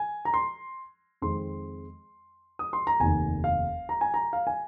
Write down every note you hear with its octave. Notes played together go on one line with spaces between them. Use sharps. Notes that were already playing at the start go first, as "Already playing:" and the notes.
Already playing: G#5
A#5
C6
F2 D#3 G#3 C4 C6
D#6
C6
A#5
F1 D#2 D#3 G#5
F5
A#5
G#5
A#5
F5
G#5